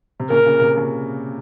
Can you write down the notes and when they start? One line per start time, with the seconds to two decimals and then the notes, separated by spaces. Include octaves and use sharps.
0.20 C3
0.30 A#2 C#3 A#4
0.46 A#2 C#3
0.61 C3
0.77 A#2 C#3